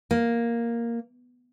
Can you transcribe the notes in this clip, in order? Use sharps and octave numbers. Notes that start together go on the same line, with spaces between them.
A#3